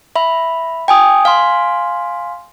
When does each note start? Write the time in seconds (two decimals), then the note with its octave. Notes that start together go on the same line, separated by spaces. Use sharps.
0.16 E5 B5
0.88 G5 G#5 D#6
1.25 F5 G#5 C6